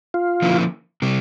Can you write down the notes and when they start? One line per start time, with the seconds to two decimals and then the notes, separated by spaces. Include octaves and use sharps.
0.14 F4
0.42 D3 F3 A#3 C#4 E4
1.02 C3 G3